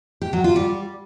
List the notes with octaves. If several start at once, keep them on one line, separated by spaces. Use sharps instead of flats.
G4
F#3
F4
G3